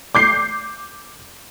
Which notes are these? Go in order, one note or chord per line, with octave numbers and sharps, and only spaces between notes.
D6 G6 C7